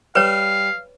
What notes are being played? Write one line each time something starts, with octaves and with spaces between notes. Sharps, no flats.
G3 B4 C#5 F5